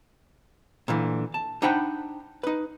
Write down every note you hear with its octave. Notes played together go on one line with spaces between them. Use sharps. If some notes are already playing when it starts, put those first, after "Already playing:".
A#2 D3 E3
A5
D4 D#4 C5 F#5 G5 B5
D#4 B4